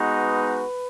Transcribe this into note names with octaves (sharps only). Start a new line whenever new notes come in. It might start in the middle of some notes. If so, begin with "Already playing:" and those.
Already playing: G#3 B3 D#4 F#4
B4